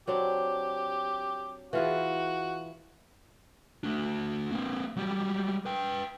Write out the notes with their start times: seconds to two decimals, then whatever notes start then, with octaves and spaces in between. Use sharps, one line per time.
0.07 F#3 C4 D4 G4
1.73 E3 F4 F#4 G#4
3.83 A3 D4
4.52 A#3 C4
4.97 F#3 G3
5.66 B4 G5